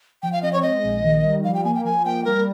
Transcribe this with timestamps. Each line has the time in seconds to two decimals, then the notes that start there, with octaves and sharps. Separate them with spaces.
0.23 F3 G5
0.33 F5
0.42 C4 D#5
0.53 C#5
0.62 G#3 D#5
0.84 A#1
1.03 D#3
1.23 G3
1.44 F3 F5
1.54 G5
1.64 A#3 G#5
1.75 G5
1.84 F3 G#5
2.05 A#3 G5
2.25 G3 A#4